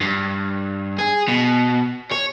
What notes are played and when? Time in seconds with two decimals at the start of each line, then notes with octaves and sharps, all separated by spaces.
0.01 G2
0.99 G#4
1.28 B2
2.12 C#5